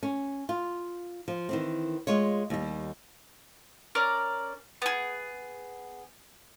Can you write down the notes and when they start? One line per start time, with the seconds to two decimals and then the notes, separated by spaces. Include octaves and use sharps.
0.03 C#4
0.49 F4
1.28 F3
1.49 D#3 E3 C4
2.07 G#3 F4 C#5
2.50 D#2 G3
3.95 C#4 A#4 D5
4.82 B3 G#4